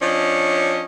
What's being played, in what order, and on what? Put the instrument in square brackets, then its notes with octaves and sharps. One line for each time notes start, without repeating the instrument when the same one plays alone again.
[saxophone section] F3 C#4 D4 C#5 D#5